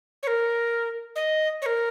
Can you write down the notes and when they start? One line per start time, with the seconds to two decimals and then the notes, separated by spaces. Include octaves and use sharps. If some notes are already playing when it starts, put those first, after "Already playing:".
0.23 C#5
0.27 A#4
1.16 D#5
1.62 C#5
1.66 A#4